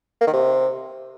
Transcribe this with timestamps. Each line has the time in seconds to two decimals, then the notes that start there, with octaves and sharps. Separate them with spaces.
0.21 A#3
0.27 D#3
0.33 C3